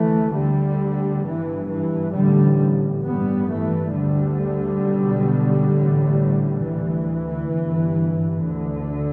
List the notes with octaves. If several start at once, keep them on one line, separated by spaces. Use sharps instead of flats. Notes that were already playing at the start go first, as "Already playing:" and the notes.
Already playing: D2 E3 A3
D2 D3 G3
G1 G2 E3
E3
A1 A2 D3 G3
A1 G2 G3 B3
E3 A3
D2 D3 G3
B1 B2
A1 A2
D2 E3
G1 G2
D2 D3